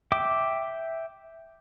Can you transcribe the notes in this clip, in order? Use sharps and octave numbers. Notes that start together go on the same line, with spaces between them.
E5 G5 D6